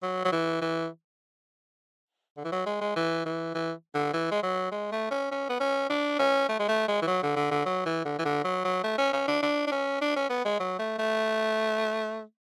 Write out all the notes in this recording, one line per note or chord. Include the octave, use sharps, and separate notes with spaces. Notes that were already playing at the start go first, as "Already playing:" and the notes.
F#3
F#3
E3
E3
D3
E3
F#3
G#3
G#3
E3
E3
E3
D3
E3
G#3
F#3
G#3
A3
C#4
C#4
B3
C#4
D4
C#4
A3
G#3
A3
G#3
E3
F#3
D3
D3
D3
F#3
E3
D3
E3
D3
F#3
F#3
A3
C#4
C#4
D4
D4
D4
C#4
D4
C#4
B3
G#3
F#3
A3
A3